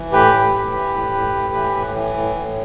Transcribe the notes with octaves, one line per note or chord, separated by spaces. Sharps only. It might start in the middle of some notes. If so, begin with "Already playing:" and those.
Already playing: E3
A2 G4 B4
A2
A2
E3
A2
A2
A2
E3
A2
E3
A2
A2